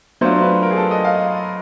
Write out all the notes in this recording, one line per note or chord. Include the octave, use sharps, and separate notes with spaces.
F#3 A3 D4 F4 C5
B4
A#4
G#4
A4
D#5
F5